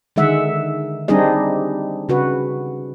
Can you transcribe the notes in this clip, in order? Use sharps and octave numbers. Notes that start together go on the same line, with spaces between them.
D3 D#3 G#3 E5 F#5
G3 C4 D4 D#4 G#4 D#5
C#3 F#4 B4